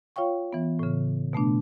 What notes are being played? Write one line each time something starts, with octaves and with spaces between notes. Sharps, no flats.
F4 C#5 F5 G5 C#6
E3 B3
A2 C#3
B2 A3 B3 D4